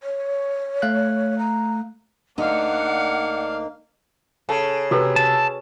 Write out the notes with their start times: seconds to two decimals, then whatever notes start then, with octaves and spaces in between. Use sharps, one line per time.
0.03 C#5
0.82 A3 F5 F#6
1.39 A#5
2.38 D2 A#3 D4 D#4 F5 F#5
4.49 C#3 A4
4.91 C3 F#4 A4 B4
5.16 A5